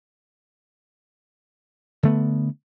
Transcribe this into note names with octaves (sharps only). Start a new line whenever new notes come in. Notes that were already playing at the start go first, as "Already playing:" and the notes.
D3 A3 B3